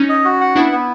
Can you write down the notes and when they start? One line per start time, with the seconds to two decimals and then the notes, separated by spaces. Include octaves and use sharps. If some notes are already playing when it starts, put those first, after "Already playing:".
Already playing: C#4 D#4
0.09 D#5
0.25 F#4
0.41 F#5
0.56 B3 D4 E4
0.72 B3